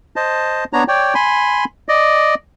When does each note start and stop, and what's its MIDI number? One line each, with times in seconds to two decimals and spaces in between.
0.16 0.64 72
0.16 0.64 75
0.16 0.64 81
0.73 0.84 59
0.73 0.84 62
0.73 0.84 73
0.73 0.84 82
0.88 1.14 73
0.88 1.14 74
0.88 1.14 79
1.15 1.65 80
1.15 1.65 83
1.15 1.65 84
1.88 2.35 74
1.88 2.35 75